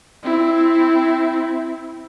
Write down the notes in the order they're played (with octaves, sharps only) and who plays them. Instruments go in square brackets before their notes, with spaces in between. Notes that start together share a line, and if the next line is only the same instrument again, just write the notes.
[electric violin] C4 E4